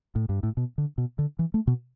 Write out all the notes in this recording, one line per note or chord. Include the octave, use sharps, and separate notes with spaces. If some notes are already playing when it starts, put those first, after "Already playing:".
A2
G2
A2
B2
D3
B2
D3
E3
A3
B2